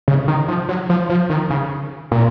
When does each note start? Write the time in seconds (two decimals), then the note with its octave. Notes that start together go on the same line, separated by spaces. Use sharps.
0.08 C#3
0.28 D#3
0.48 F3
0.69 F#3
0.89 F3
1.10 F3
1.30 D#3
1.50 C#3
2.12 A#2